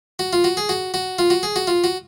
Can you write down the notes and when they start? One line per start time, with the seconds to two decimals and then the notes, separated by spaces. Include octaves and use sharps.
0.19 F#4
0.33 F4
0.44 F#4
0.57 G#4
0.69 F#4
0.94 F#4
1.19 F4
1.30 F#4
1.43 G#4
1.56 F#4
1.67 F4
1.84 F#4